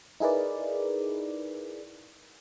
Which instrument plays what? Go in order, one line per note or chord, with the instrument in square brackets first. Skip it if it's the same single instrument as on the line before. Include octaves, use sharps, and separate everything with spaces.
[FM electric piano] D#4 E4 G#4 A#4 B4 D5